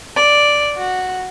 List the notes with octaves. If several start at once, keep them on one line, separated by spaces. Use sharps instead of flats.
D5
F#4